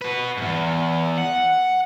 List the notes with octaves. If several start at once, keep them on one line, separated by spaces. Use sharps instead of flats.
F#4 B4
E2 G#2
F#5